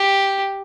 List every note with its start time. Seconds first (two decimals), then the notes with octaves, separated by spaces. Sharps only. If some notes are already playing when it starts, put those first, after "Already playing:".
Already playing: G4